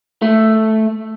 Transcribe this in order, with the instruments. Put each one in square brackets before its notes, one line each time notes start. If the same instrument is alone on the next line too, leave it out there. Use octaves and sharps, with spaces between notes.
[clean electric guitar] A3